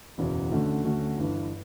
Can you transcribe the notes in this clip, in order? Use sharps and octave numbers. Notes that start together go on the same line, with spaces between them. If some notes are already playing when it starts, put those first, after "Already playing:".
F#1 E2 B2 F#3
D2 D3 A3 C#4 F#4
D2 D3 A3 C#4 F#4
G1 G2 E3